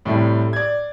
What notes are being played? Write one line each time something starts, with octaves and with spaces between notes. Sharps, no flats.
A2 C3 G3 A3
D5 G#6